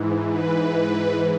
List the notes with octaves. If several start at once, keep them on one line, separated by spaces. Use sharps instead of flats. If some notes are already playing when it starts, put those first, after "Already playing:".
Already playing: G#2 E3
B4